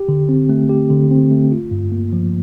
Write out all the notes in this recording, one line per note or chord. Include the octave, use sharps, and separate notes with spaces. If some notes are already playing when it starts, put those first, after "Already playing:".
Already playing: G4
D3
C4
A3
G4
D3
C4
A3
F4
G2
A#3
F3